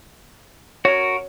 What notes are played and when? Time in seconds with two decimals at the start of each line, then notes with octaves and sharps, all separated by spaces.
0.85 F#4 A#4 C#5